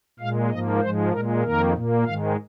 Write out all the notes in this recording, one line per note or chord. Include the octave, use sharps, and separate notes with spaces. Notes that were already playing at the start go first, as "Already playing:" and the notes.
A#2 G#3 F5
G#2 F3 A#3 D#5
G#2 F3 G#3 C5
A#2 G#3 A#4
F2 D#3 A#3 A#4
A#2 A#3
G#2 D#3 G#3 F5